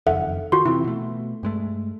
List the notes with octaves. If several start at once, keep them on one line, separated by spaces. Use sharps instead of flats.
F#1 F2 D#3 A4 E5 F#5
D#3 F4 F#4 C6
C3 E3 C4 E4
B2 A3
G2 G#3 A3